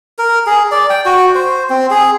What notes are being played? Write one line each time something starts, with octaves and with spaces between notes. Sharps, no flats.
A#4
G#4
D5
G5
F#4
C5
C4
G#4